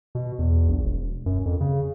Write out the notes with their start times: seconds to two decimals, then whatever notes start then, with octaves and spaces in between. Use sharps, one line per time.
0.15 B2
0.39 E2
0.69 A#1
0.84 E1
1.26 F#2
1.46 F2
1.60 C#3